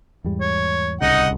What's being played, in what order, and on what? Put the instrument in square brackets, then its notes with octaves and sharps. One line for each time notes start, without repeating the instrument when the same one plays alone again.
[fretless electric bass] E2 G#2 G3
[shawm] C#5
[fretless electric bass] D1 C2 C#3 [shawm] D#4 [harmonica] D#5 F#5